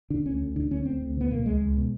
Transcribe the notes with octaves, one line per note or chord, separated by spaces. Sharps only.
D3 D4
D2 C#4
D2
D3 D4
D3 C#4
D2 C4
D2
D3 B3
B2 A#3
C#2 G#3
C#2
B2